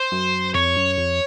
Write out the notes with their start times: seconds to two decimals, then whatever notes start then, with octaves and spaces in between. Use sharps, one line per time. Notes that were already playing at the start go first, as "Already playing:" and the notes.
Already playing: C5
0.12 F#2
0.54 F2 C#5
0.76 F#2
0.98 F2